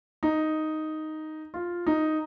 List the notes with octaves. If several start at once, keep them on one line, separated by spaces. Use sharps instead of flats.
D#4
F4
D#4